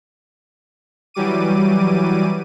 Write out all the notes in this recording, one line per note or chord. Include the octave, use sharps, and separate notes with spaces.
E3 F#3 G3 D6 D#7